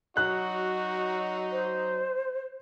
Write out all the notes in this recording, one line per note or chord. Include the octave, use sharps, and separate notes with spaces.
F#3 D#4 F#4 F#6
C5